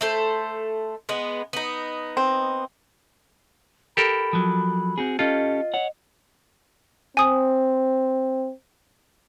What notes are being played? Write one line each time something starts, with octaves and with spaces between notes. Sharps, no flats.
A3 A4 C5
G#3 B3
B3 D#4
C4
G4 A4 A#4 B5
F3 F#3
C4 F#4 G#4
C#4 F4 G4 A4 D#5
C#5 F#5
C4 G#5 D#6